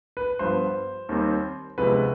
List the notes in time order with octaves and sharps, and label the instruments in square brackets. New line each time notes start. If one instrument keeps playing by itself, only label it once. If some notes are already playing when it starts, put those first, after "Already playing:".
[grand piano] B4
G2 F3 B3 C5
D#2 D#3 G3 C4
D2 C3 F3 G#3 B3 B4